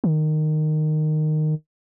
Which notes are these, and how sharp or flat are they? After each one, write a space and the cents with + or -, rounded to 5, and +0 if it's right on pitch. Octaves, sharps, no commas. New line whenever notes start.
D#3 -15